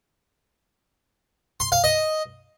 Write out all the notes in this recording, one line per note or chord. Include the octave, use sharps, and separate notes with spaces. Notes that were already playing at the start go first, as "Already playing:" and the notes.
C6
F5
D#5